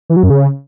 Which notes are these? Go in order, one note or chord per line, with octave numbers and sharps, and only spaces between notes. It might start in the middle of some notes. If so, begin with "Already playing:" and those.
E3
F#3
F#2
C#3